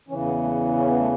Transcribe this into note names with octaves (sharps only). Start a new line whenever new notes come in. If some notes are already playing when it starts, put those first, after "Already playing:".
E2 C#3 E3 C#4
B3
A3
C#4
B3
A3